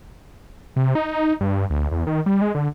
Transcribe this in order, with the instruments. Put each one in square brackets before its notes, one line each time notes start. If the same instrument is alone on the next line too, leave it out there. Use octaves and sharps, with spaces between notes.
[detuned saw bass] C3
D#4
G2
D2
E2
D#3
G3
G#3
D3